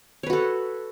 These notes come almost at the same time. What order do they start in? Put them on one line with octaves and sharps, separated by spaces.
C#5 B4 F#4 A4